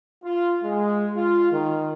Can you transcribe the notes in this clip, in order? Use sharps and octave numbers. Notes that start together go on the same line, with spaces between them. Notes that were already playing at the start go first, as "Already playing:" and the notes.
F4
G#3
F4
D#3